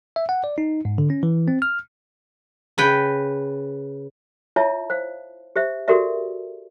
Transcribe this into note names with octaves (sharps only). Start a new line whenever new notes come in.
E5
F#5
D5
D#4
G#2
D3
C#4
E3
C4
F6
C#3 B4 G5
E4 F4 C#5 E5 A5
C5 F5
G4 C5 E5
F#4 G4 A4 A#4 D5 E5